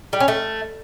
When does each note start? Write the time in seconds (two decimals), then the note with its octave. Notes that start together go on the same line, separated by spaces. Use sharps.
0.13 G3
0.20 C#4
0.28 A3